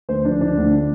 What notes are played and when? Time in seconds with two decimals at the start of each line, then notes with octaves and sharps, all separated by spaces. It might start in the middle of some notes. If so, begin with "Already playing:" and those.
0.09 D2 C5
0.25 F3 D4
0.41 D3 D4
0.57 D2